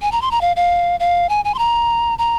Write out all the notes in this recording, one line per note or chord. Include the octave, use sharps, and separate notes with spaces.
G#5
A#5
C6
A#5
F5
F5
F5
G#5
G#5
C6
A#5
A#5